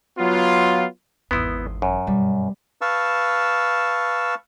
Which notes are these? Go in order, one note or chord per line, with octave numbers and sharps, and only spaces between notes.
F#3 B3 F4
G#1 E2 B3 E4 C6 D#6 B6
F#2
G2 B2 G3
B4 F5 A5 C#6 E6